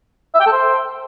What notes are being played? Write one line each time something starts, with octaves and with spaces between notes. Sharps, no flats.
E5
G5
A4
C5